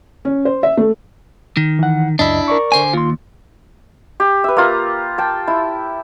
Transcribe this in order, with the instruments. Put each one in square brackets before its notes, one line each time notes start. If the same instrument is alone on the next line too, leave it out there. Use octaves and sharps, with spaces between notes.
[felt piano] C#4
C5
E5
A3
[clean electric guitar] D#3
[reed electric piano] E3 F#5
[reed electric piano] C#2 F#2 D#5 [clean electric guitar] D4 E4
[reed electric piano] A#4 D5 C#6
[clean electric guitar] D3 C5 G#5
[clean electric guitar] D#2 [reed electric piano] F4 C6
[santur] G4
B4 E5
A#3 F4 A#5
G5 A5
E4